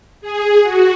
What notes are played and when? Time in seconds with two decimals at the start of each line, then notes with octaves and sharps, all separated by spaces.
0.21 G#4
0.63 F#4